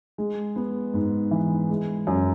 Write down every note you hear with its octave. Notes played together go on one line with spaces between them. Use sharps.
G#3
B3
G#2
E3
G#3
F#2